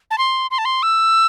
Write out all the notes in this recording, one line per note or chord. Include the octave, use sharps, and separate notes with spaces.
A5
C6
C6
A5
C6
E6